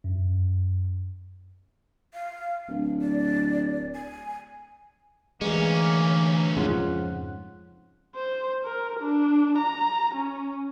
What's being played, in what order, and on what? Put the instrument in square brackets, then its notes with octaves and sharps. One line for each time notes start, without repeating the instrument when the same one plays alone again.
[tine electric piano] F#2
[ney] F5
[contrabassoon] D1
[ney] D5
G#5
[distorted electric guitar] D2 C#4 [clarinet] E3 [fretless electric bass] G#3 [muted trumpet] A#3
[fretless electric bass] F2 G#2 C#3 [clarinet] F4 [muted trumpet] F#5
[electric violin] C5
A#4
D4
A#5
C#4